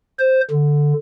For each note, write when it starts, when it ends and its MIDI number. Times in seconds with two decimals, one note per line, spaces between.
0.19 0.40 72
0.50 0.93 50